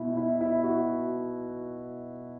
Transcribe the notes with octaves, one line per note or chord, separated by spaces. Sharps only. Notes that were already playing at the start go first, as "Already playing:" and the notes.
Already playing: B2 E4
E4
E4
F#4